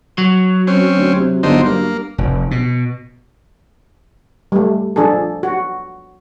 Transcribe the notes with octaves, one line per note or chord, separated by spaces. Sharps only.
F#3
C4 C#4
D2
C3
G1 D3 D#4 C5
G2 A#3
F1
B2
G3 A3
F3 D4 G#4 A4
F#4